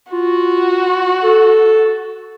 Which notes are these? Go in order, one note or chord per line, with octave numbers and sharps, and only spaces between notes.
F4 F#4
A4